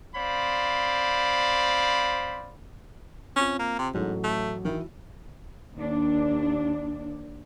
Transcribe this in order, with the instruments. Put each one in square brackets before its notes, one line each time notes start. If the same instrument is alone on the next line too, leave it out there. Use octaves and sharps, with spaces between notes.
[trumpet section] C4 C5 D5 F5 B5
[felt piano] C4 F4 [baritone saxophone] C#4
[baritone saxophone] A#3
C3
[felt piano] A1 F#3 A4 [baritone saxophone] G#2
[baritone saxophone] A3
[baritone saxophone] D#3 [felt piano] E3 E4 F#4
[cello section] D#2 D4